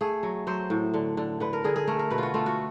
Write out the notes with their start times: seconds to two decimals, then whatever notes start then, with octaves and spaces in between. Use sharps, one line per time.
0.01 A3 G#4
0.23 F#3
0.47 F#3 C5
0.70 A2
0.94 D3
1.17 D3
1.40 D3 B4
1.53 A#4
1.64 D3 G#4
1.76 G#4
1.88 A3 A#4
1.99 A#4
2.10 B2 B4
2.18 F4 F#4
2.34 A3 F4
2.46 F#4